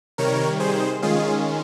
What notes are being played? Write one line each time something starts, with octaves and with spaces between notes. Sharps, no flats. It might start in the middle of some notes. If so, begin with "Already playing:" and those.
C3 D#3 G3 A#4 C#5
G#4 C5
D#3 G#3 C#4 F4 G#4